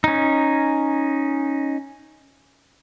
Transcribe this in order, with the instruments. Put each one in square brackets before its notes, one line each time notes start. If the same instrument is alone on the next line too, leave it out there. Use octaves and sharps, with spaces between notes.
[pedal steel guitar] C#4 D#4